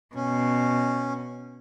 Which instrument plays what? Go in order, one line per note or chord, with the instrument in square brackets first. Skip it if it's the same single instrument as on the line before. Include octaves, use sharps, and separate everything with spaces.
[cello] B2 [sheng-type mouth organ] C#4